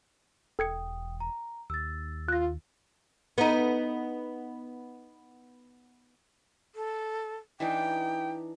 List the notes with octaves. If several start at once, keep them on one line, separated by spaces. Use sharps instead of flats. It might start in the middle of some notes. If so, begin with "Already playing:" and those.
E1 A4 G5 D#6 G#6 C#7
A#5
D#2 E6 A6
F4 F#6 A#6
B3 D#4
A4
E3 D4 D#4 G5